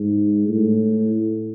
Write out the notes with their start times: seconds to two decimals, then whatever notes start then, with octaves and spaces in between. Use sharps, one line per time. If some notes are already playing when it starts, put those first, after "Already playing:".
Already playing: G#2
0.49 A2